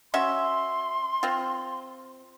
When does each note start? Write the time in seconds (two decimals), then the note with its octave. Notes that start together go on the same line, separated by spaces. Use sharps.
0.14 C#4 F#4 E5 C6
1.23 C4 F4